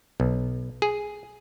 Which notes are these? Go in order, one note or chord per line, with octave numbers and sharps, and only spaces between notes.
B1
G#4